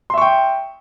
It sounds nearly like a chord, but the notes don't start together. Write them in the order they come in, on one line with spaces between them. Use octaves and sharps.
C6 E5 C#6 G5